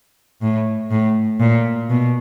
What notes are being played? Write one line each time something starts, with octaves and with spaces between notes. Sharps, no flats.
A2
A2
A#2
B2